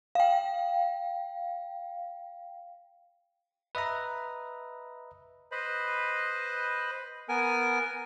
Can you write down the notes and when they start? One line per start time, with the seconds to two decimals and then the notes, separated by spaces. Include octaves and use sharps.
0.15 F5 G5
3.75 B4 D#5 E5 A#5
5.52 B4 C5 D#5 B5
7.29 B3 A#4 G#5